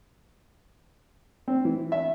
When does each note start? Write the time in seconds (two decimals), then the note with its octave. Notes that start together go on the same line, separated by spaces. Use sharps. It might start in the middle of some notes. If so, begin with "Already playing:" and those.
1.48 C4
1.65 E3
1.92 E5